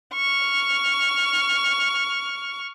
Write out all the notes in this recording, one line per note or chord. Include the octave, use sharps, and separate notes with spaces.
C#6 F6